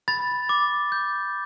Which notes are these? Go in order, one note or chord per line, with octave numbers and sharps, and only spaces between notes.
B5 A6
D6
G6